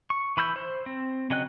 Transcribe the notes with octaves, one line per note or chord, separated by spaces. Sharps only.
C#6
E3 B5 E6 G6
C5
C4
C#3 F#3 D#5 G5 F#6